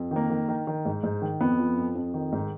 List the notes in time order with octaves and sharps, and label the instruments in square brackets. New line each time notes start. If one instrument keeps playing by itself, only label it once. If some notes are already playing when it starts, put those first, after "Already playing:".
Already playing: [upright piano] F2
D#3 A#3
D#3
D#3
D#3
G#2
G#2
D#3
F2 B3
F3
F2
F2
D#3
G#2